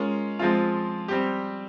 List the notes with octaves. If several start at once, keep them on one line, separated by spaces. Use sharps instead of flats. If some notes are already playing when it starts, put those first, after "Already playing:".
Already playing: G#3 C#4 F4 A#4
F3 G#3 C4 F4
G3 C4 G4